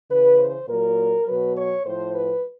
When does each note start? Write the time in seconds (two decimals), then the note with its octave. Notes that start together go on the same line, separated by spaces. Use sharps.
0.10 C#3 E3 B4
0.39 C5
0.68 A#2 F#3 A#4
1.27 B2 F#3 B4
1.56 C#5
1.85 A2 F3 C5
2.14 B4